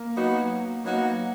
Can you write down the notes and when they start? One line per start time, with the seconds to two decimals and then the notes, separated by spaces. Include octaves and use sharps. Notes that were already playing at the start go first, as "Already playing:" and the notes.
Already playing: A#3
0.16 F#3 B3 D#4 F#4
0.84 F#3 A#3 B3 D#4 F#4